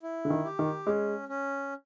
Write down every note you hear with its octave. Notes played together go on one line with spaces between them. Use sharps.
E4
D3
D#3
G4
D#3
G#3 C#4
C#4